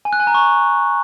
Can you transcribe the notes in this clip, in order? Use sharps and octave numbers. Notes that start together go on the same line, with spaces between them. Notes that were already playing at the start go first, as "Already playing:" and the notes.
G#5
F#6
G#5
A#5
C#6